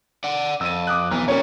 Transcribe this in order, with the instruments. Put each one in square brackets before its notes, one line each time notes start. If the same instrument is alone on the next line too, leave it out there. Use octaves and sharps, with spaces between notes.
[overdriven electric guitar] D5 F#5
[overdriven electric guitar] F2 [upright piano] E6 D#7
[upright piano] D6 D#6 F#6
[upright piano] B1 [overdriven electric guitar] E3
[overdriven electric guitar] A#2 G3 [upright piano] A#3 C#4 C#5